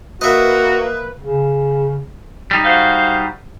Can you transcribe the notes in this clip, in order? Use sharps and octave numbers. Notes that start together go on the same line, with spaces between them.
A#3 F#4 B4 D#5 E5
C#3
G3 D#4
F#4 C5 F5